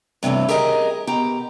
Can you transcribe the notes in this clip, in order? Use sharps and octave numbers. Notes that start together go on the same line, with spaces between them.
G2 C3 E3 A3 C#4
G4 G#4 A#4 D#5 G#5
B2 G4 A#5